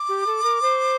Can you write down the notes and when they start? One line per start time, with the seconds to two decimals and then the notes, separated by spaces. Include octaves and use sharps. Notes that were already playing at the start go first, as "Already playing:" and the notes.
Already playing: D6
0.09 G4
0.27 A4
0.43 A#4
0.62 C5